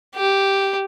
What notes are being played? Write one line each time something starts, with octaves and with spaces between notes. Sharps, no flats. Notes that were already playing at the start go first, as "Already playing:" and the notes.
G4